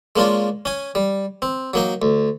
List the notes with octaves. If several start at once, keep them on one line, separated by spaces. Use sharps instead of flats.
G#3 A#3 C#4 D4 F4
C#4 G#5
G3
C4
F#3 A#3 D#4
D2